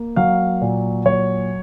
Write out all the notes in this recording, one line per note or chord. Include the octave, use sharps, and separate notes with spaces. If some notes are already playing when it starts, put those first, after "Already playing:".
Already playing: A#3
F#3 F5
A#2
F#3 C#5